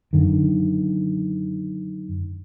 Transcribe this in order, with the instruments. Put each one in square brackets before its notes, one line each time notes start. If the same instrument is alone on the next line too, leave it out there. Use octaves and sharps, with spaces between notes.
[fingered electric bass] F#2 D3 D#3